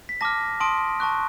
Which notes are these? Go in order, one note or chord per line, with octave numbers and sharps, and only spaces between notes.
B6
A5 D6 F6 A#6
A5 C6 D#6 D7
A5 C#6 F#6